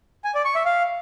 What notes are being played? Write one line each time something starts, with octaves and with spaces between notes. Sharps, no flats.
G#5
D5
C#6
E5
F5